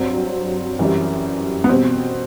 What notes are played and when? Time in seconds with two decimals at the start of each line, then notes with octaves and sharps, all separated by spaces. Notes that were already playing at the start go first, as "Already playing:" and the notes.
Already playing: G2 F#3 C4
0.79 F#2 E3 G3
1.64 B3
1.69 B2 G3 C4